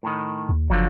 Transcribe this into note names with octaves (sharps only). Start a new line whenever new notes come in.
A2 D#3
D#2
F#1 D3 F3 F#3